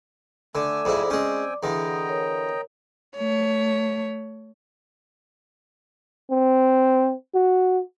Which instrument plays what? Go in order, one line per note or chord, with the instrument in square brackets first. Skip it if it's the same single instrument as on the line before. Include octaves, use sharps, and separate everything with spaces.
[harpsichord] D3 [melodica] A3 G#5 E6 [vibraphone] D5 D6
[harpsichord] F2 G#2 E4
[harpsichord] G#3 C#4 [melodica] C4 G5 G#5
[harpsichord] E2 D3 [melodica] D#5 G5 A#5
[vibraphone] A#4 C#5
[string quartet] A3 C#5
[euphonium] C4
F#4